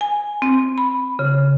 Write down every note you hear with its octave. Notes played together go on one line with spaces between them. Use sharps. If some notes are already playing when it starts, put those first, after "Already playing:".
G#5
C4
B5
C#3